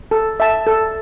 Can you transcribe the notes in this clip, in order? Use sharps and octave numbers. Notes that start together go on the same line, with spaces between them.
A4
E5 A5
A4